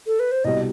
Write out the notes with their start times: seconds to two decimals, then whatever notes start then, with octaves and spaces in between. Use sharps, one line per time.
0.07 A4
0.20 B4
0.32 C5
0.44 C2 B2 G3 D#5